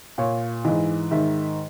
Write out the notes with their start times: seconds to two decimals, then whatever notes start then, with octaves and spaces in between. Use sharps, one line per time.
0.18 A#2 C#5
0.65 G#2 E3 D#5
1.11 G#2 D#3 E5